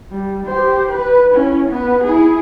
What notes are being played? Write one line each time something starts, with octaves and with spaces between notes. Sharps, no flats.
G3
G4 C5
B4
C#4 E4
B3 B4
E4 G#4